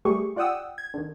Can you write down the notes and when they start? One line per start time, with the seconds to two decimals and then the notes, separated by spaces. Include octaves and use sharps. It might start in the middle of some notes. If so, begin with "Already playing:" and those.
0.05 G3 A3 G4 G#4 C#6
0.36 F4 D5 F#5 G5 D#6 E6
0.78 G#6
0.94 D3 D#3